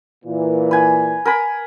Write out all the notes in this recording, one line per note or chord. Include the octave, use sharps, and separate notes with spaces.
A#2 E3
B4 G#5
A#4 G#5 B5